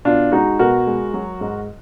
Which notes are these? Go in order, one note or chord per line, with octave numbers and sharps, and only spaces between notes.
B2 D4 F4
G#3 D#4 F#4
B2 F#4 A#4
G#3
F#3
G#2